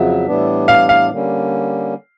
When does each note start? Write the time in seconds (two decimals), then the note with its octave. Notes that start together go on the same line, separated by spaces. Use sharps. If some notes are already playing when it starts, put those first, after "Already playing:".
Already playing: F2 C#3 F#3 E5
0.26 A2 E3 G3 B3 D4
0.68 F5
0.89 F5
1.11 D3 G3 A#3 C#4